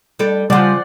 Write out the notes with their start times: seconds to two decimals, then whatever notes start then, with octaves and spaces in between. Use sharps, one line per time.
0.19 G3 D4 A4
0.50 C#3 F3 G3 D5 F#5 C6